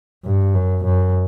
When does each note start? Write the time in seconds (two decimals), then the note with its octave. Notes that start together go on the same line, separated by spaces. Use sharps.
0.24 G2
0.54 F#2
0.85 F#2